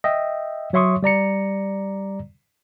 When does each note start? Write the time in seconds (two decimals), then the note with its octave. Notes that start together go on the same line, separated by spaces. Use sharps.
0.04 D#5 E5 G5
0.73 F#3 C#5 E5 C6 C#6 D#6
1.03 G3 D5 A#5 C#7